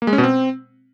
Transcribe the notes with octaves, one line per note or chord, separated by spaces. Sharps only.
A#3
G#3
C#4
B2
C4